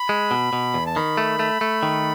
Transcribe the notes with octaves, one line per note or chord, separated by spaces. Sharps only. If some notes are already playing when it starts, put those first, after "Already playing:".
Already playing: B5
G#3
B2
B2
E2
A5
D#3 B5
A3
A3
A3
D#3